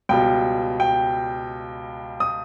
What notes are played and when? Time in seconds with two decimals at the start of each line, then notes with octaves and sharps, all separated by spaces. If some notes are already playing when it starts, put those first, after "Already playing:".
0.09 C#2 B2 G3 G5
0.80 G5
2.20 D#6